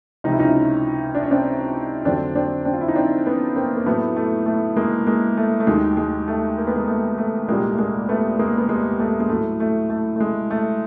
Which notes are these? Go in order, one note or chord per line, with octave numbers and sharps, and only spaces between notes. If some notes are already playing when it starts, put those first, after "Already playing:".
C#2 C3 F3 D#4
E4
C#4 D#4
D4
C#4
C4 D4
F2 D3 F#3 C4 D4
C4 D4
C4 D4
F4
E4
D#4
C4 D4
B3 C#4
A#3 C4
A#3
A2 F#3 A3 B3
A3
A3
G#3 A#3
G#3 A#3
A3
A3
D#2 D#3 F#3 G#3
G#3
A3
A#3
B3
G#3 A#3
A3
A3
C2 A#2 G3 G#3 A#3
A3
G#3 A#3
A3 B3
G#3 A#3
B3
G#3 A#3
A3
G#3
A2 F#3 A3
A3
A3
A3
G#3
A3